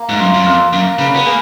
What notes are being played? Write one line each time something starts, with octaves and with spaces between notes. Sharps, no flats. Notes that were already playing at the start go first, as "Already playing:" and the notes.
Already playing: A#3
G#2
F#2 F4
F#2
F2 A#3
F#2 A#3
C#3 B4
B3
A#3 G#4